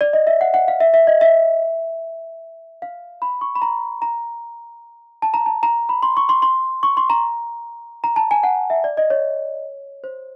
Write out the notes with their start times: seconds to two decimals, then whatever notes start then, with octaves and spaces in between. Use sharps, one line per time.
0.01 D5
0.13 D#5
0.27 E5
0.41 F#5
0.54 F#5
0.68 F5
0.81 E5
0.94 E5
1.07 D#5
1.21 E5
2.82 F5
3.22 B5
3.41 C#6
3.55 B5
3.62 A#5
4.02 A#5
5.22 A5
5.34 A#5
5.46 A5
5.63 A#5
5.89 B5
6.03 C6
6.17 C#6
6.29 C6
6.42 C6
6.83 C#6
6.97 C6
7.10 A#5
8.04 A#5
8.16 A5
8.31 G#5
8.43 F#5
8.70 E5
8.84 D5
8.97 D#5
9.10 C#5
10.04 C5